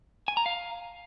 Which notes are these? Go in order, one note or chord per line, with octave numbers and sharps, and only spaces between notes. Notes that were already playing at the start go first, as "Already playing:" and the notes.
G#5
A#5
F5